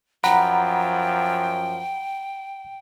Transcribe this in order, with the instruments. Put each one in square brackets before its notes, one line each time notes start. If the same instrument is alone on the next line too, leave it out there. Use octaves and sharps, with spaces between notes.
[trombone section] F#2 F3 [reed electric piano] F#5 A#5 B5 [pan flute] G5